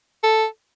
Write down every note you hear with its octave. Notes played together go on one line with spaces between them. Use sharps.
A4